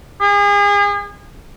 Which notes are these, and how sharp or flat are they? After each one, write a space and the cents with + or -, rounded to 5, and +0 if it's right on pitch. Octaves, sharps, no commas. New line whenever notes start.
G#4 -35